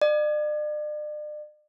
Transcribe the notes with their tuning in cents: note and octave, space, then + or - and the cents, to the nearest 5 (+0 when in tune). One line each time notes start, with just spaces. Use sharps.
D5 +40